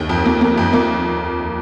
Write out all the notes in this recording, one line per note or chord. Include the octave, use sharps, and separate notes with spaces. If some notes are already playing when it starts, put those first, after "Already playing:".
Already playing: D#2
F2
A#3
A#3
F2
A#3